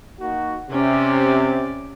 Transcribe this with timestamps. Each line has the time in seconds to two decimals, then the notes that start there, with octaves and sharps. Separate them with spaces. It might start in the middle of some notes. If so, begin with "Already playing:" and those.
0.21 A#3 D#4 F#4
0.71 C3 C#4 D5